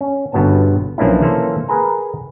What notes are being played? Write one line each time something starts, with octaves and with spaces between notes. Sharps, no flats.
C#4
G1 G2 B2 B3 C#4 A5
B1 F3 A#3 C#4 D4 E4
E3 A#3 C#4 A4 C5
G#4 A#4 B4 G#5 A#5